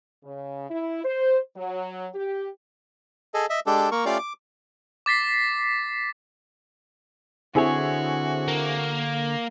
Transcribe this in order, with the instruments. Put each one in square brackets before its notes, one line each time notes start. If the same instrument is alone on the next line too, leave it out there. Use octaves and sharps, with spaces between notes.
[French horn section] C#3
E4
C5
F#3
G4
[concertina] G#4 A4 D#5
D#5 E5
G#3 D4 G4 A4
A#3 A#4 C#6
A3 C#4 F4 G4 D5 F5
D6
[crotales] D6 A6 B6 C7
[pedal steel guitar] D3 C#5 [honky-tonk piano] C4 E4 G#4 [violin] F#4
[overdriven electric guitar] A#3